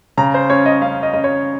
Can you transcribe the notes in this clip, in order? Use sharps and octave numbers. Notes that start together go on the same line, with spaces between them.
C#3 A#5
C5
C#4 C#5
D#5
C#4 F5
D#5
C#4 D#5
C#5